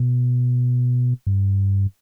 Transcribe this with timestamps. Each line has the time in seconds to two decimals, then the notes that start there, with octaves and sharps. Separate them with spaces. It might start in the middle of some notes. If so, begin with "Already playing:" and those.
Already playing: B2
1.27 G2